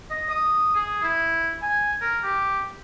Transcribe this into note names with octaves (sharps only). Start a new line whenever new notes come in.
D#5
D#6
G#4
E4
G#5
A#4
G4